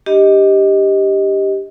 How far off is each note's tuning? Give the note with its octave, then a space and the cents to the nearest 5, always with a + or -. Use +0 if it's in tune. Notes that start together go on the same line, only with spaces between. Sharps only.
D4 +15 G4 +0 D#5 +10